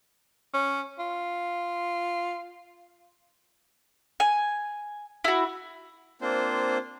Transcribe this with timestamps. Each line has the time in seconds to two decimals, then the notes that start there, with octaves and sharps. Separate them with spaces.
0.54 C#4
0.99 F4
4.20 G#5
5.24 E4 F#4
6.21 A#3 C4 D4 F4 C5